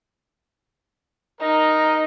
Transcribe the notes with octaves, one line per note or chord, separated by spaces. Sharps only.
D#4 A#4 D#5 A#5